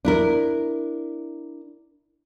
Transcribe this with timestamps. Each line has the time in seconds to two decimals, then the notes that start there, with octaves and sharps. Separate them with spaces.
0.05 D4 E4 A#4